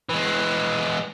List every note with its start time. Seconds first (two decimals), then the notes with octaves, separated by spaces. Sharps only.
0.10 E3 G#3